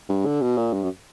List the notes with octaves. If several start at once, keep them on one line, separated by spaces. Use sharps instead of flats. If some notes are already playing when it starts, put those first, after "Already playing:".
G2
D3
B2
A#2
G2
F#2